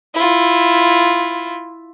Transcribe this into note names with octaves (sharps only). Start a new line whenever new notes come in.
E4 F4